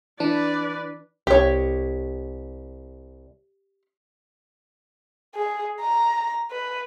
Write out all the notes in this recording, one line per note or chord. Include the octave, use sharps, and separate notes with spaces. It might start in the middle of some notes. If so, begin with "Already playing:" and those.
E3 D4 B4 D5
C2 G4 C#5
G#4
A#5
B4